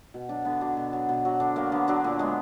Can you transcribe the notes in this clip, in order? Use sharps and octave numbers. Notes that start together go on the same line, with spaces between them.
B2
F#3 D4
D3 B3
F#3 D4
B2
F#3
B2
F#3
D3 D4
F#3 A#3
D3 B3
F#3 D4
A#2
G#3 B3